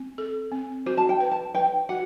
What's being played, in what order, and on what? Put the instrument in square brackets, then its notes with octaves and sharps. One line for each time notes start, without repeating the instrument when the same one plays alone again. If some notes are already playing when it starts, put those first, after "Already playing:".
Already playing: [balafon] C4
A4
C4
[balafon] F#4 [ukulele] C5
[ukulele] A5
G5
[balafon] B4
[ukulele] A5
[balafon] B4 [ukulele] G5
[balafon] F#4 [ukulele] F#5